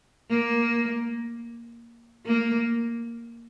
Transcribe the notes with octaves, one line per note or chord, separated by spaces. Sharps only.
A#3
A#3